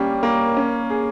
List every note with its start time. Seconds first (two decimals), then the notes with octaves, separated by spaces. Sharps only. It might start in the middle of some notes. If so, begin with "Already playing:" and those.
Already playing: G3 A#3 C#4
0.23 A#3
0.57 C#4
0.90 G#4